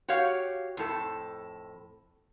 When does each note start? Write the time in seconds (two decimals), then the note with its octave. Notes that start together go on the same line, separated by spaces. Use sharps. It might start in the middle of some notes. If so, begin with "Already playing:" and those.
0.08 F#4 G4 C#5 F5
0.77 F2 A2 A4